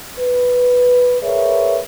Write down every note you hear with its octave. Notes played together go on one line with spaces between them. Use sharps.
B4
G#4 A#4 B4 C#5 D5 E5